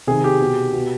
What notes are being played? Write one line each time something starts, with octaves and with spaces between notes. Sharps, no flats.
C3 D#3 G#4
G4
B2
B2